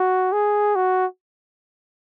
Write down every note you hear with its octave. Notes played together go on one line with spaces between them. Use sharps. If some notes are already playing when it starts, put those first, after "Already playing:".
Already playing: F#4
G#4
F#4